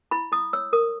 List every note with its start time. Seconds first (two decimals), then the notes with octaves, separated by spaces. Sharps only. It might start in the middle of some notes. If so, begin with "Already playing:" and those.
0.11 E4 B5
0.32 E4 D#6
0.53 C#5 E6
0.73 A#4 D#6